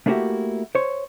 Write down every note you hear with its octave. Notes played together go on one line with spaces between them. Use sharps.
A3 A#3 D4 E4 F#4 G4
C5 C#5